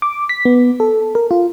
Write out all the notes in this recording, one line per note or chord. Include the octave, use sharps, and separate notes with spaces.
D6
B6
B3
A4
A#4
F4